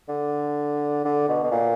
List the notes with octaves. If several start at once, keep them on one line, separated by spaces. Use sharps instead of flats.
D3
D3
B2
B2
A#2